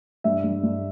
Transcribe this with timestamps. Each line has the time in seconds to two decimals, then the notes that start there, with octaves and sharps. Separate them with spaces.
0.24 G2 E5
0.44 G2
0.64 G2